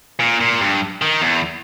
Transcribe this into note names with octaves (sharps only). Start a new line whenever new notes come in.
A#2
A#2
G2
D#3
E2